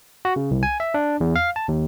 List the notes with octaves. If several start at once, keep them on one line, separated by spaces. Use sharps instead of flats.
F#4
C#3
C2
G#5
E5
D4
E2
F5
A5
D#2